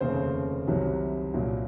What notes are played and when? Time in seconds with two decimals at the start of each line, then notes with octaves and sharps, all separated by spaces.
0.01 F1 D#2 C#3 C5
0.67 C2 C3 D#3 F#3
1.34 C2 A#2 F#3